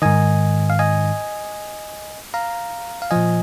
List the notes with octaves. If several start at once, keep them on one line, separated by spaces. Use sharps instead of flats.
G#2 D#3 D#5 G#5
F5
D#5 G#5
F5 A#5
F5
A#2 F3 D#5 G#5